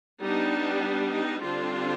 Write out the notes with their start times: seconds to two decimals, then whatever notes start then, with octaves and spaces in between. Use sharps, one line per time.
0.21 G3 B3 D4 D#4
1.11 D#4
1.42 D3 G3 C4 D4 F4